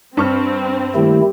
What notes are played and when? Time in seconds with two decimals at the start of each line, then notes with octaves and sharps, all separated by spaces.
0.17 G2 C4 C#6 F6
0.95 D#3 G3 A3 A#3 E4 G4